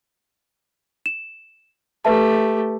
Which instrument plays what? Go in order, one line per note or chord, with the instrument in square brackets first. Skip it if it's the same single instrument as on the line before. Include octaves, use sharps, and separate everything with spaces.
[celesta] E7
[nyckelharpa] A3 G4 [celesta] B4 E5 A5